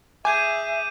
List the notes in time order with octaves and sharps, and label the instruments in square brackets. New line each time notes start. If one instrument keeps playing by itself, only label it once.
[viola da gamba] G#4 [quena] E5 [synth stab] G#5 [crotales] D6 G6 D#7